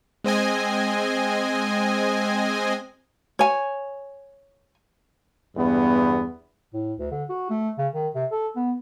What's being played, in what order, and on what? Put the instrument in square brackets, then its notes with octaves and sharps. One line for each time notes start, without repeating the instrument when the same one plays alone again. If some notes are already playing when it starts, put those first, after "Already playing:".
[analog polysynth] G#3 C4 D#5 G#5
[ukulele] C#5 G#5
[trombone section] E2 G2 B3
[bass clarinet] A2
D2
D3
F#4
A3
C#3
D#3
C3
A4
B3